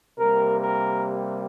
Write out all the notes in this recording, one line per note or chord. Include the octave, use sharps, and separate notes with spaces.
C3 G3 A#3 A#4
A#4